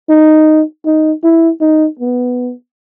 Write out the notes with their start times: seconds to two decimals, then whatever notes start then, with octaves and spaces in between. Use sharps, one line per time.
0.09 D#4
0.85 D#4
1.23 E4
1.60 D#4
1.99 B3